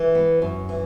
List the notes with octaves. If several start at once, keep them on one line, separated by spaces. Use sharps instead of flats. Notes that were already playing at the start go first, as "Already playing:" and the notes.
Already playing: E3
B3
F#2
E3